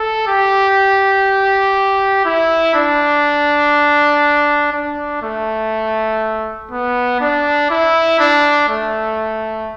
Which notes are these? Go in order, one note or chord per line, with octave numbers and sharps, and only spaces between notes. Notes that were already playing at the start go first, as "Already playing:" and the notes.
Already playing: A4
G4
E4
D4
D4
A3
B3
D4
E4
D4
A3